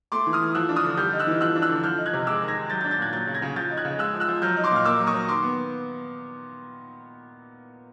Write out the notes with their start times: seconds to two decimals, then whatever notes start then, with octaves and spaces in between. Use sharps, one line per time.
0.12 A3 C6 D6
0.27 E3
0.33 D#6 F6
0.41 E3
0.55 F3 E6 F#6
0.69 D4
0.76 D#6 F6
0.84 D3
0.97 G3 F6 G6
1.13 D#4
1.19 E6 F#6
1.27 E3
1.41 F3 E6 F#6
1.56 D4
1.62 E6 F#6
1.69 D3
1.84 F3 F6 G6
1.98 D#4
2.06 F#6 G#6
2.13 C3
2.27 G#3 D6 E6
2.42 D#3
2.48 G#6 A#6
2.56 D#3
2.70 F#3 G6 A6
2.81 G6 A6
2.84 D4
2.91 G6 A6
2.98 A#2 F#6 G#6
3.13 F#3 G6 A6
3.27 C#3
3.35 G#6 A#6
3.42 C#3
3.56 F3 G6 A6
3.71 D#4
3.77 F#6 G#6
3.85 C#3
3.99 G#3 E6 F#6
4.14 F3
4.20 E6 F#6
4.28 F3
4.42 F#3 F6 G6
4.57 D#4
4.64 C6 D6
4.71 A#2 F6
4.85 A#3 D6 E6
5.00 F#3
5.07 C#6 D#6
5.14 F#3
5.28 D#3 C6 D6
5.43 B3